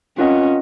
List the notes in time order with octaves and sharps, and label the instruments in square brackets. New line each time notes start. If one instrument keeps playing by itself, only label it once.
[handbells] C4 F4 A#4 D#5 F#5 [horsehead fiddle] C#4